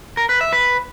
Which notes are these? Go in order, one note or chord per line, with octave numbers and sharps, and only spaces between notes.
A#4
B4
E5
B4